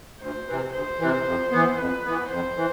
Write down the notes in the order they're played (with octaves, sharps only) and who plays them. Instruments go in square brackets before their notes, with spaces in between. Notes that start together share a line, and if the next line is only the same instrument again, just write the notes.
[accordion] D2 [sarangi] C5
[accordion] C3 E3
[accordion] D2 [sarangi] C5
[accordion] C3 E3
F2
E3 B3
[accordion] F2 [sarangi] B4
[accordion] E3 B3
[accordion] F2 [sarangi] C5
[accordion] E3